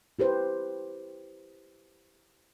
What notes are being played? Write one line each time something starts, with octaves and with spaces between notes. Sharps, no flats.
E4 G4 B4 C5